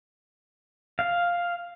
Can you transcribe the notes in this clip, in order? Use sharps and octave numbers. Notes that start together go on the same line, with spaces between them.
F5